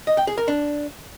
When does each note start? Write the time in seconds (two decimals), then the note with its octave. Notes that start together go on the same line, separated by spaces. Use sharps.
0.07 D#5
0.17 G5
0.27 G#4
0.38 A#4
0.48 D4